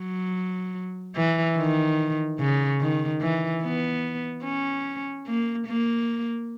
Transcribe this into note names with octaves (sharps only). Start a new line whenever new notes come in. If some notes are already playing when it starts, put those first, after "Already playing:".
Already playing: F#3
E3
D#3
C#3
D#3
E3
B3
C#4
A#3
A#3